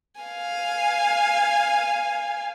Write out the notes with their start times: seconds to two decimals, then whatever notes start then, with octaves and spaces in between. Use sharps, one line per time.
0.21 F5 G#5